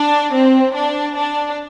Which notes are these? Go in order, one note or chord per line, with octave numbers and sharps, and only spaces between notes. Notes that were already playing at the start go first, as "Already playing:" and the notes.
Already playing: D4
C4
D4
D4